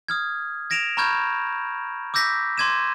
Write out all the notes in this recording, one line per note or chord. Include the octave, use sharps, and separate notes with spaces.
D#6 F6 G#6
G#6 A#6 D7 E7 F7
A#5 B5 C#6 F6 G6 G#6
D6 E6 G6 A#6 B6
C6 D6 G#6 D#7 E7